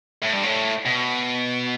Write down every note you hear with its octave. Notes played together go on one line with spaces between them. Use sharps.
A2
G2
A2
B2